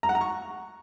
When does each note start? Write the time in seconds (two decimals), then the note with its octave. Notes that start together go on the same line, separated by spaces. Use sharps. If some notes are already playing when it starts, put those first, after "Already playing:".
0.03 A#5
0.09 F#5
0.15 A#5
0.21 C#6